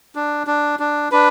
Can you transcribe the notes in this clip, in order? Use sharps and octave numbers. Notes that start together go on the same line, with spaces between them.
D4
D4
D4
D4 B4